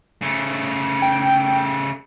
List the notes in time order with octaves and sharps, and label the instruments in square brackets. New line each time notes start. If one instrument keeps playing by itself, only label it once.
[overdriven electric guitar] C#3 A3
[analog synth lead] G5